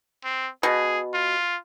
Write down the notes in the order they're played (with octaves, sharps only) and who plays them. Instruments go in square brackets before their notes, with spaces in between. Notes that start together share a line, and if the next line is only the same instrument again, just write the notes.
[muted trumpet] C4
[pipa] B2 [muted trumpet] G#4
[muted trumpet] F4